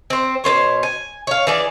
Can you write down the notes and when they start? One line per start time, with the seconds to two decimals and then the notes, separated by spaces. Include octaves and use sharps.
0.10 C4 C5
0.44 B2 B3 C5 C#5
0.83 G#5
1.27 C#5 F5
1.47 E3 G#4 D5